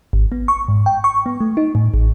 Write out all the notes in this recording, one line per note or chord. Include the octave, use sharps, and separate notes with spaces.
G#1
B3
C#6
G#2
G5
C#6
B3
A3
D#4
A2
A1